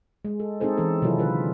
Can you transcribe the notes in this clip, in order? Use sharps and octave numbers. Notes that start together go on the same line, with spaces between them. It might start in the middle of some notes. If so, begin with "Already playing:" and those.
G#3
A4
G#3 C4 D#4 G#4 A4 C5
E3 B3 C#4 A4
C3 D#3 F#3 E4 F4 A4
D3 F4 B4